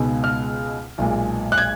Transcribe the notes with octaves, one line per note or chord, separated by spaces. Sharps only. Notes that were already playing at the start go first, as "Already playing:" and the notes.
Already playing: C#2 B2 G#3 B3 D#4
F6
B1 A#2 G#3
F#6
G#6